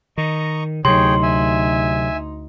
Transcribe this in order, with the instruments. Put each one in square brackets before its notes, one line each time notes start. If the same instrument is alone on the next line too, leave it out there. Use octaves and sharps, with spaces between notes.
[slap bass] D#3 [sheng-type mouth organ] D#5 A#5 C#6
[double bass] D2 D#4 [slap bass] C3 F#3 [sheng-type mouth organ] G#4 C#5 G5 [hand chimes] C6
[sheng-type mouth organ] E5 G#5